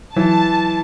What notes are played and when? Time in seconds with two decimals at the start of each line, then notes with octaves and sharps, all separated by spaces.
0.16 E3 F#3 A5